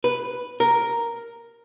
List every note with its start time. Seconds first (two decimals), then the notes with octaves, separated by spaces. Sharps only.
0.04 B4
0.60 A#4